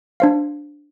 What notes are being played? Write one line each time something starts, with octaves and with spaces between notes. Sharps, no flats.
D4 C5 F5